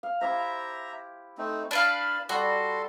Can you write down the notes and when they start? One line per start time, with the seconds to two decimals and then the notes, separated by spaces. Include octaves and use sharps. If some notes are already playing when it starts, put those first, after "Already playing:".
0.03 F5
0.21 E4 G4 C5 E5 A#5
1.38 A3 C4 D#4
1.71 D4 B4 F5 A5 B5
2.29 G3 F#4 A4 C6